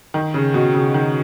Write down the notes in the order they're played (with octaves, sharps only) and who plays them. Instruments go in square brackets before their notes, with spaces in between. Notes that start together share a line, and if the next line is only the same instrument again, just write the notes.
[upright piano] D#3
C#3
B2
C#3
D#3